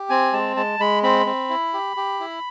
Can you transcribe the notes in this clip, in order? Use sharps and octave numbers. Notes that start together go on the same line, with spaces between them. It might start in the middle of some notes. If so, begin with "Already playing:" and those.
Already playing: G4
C4 G#5
G#3 A5
G#3 A5
G#3 B5
C4 B5
C4
E4
G4
G4
E4